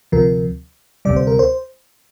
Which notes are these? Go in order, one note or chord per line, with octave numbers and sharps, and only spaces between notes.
D2 C3 F3 A#4
D2 C3 G3 D5
C5
A#4
C5